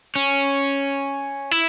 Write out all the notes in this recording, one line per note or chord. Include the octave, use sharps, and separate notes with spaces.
C#4
E4